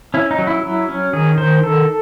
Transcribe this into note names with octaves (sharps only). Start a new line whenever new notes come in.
C#4 E4
D#4
F#3
E4
F#3
C#4
D#3 G#4
D#3 C5
D#3 A4